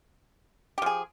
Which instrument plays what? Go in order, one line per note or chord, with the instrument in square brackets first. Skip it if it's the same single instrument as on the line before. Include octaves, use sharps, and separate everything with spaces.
[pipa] G4
F3
G#4